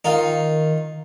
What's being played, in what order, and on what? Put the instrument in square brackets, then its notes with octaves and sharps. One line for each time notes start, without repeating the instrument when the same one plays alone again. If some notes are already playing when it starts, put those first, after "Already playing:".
[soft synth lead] D#3 [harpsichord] D#4 F4